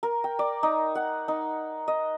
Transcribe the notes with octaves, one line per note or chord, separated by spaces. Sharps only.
A#4
G5
D5
D#4
F#5
D#4
D#5